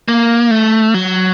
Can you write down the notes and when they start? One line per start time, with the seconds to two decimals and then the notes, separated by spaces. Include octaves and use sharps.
0.08 A#3
0.51 A3
0.94 F#3